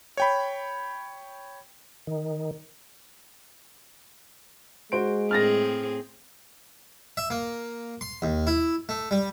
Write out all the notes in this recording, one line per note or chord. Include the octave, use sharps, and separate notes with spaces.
C#5 G5 B5
D#3
G#3 F#4 C5 D7
A2 C4 G#4 F6 A6 A#6
E5
A#3
C6
D#2
E4
A3
G3